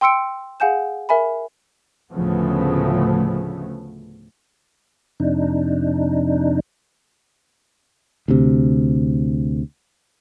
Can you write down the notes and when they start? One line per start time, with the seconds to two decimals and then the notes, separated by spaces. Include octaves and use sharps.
0.01 G5 C6 E6 C#7 D7
0.60 G#4 F5 F#5 G#5 G6 E7
1.09 A#4 E5 G#5 B5
2.12 D2 A2 C#3 F3 A3 B3
5.20 F2 C3 D4 D#4
8.28 D2 C3